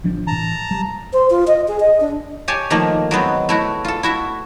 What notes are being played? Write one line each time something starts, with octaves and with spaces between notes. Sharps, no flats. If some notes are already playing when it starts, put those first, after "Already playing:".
A1 F3 D4
A2 E3 A5 A#5
G3
C5
F4
D#5
G#4
D#5
D4
G4 C#5 G#5 A5
D#3 F3 A3 A#3
F#3 G#3 B3 C4
A3 E4 F#4
F4 A4
E4 F#4 E5